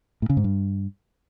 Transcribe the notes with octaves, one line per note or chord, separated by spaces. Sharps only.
A2
C#3
G#2
G2